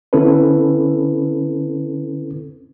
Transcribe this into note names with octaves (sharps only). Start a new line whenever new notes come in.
D3 C4 C#4 E4 A4 B4